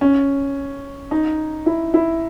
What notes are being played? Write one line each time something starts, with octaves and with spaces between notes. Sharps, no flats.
C#4
D#4
E4
E4